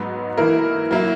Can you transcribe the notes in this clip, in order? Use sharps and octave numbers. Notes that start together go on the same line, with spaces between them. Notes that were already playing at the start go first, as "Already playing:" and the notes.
Already playing: G#2 F#3 B3 D#4
E3 A#3 E4 A#4
F#3 A#3 E4